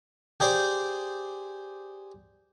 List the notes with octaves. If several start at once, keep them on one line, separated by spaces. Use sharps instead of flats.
G4 G#4 C5 D5